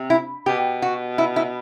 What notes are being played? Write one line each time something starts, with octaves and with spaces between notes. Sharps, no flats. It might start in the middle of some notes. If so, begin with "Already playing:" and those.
Already playing: C3
E4
B2 G4
F#4
E4
E4